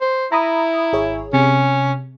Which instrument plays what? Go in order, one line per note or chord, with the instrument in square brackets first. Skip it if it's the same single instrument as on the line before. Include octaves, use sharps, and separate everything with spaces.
[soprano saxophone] C5
[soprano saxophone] E4 [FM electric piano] A#5 B5 D#6
[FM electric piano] G#1 G#4 C#5
[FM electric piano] C3 [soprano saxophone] C#4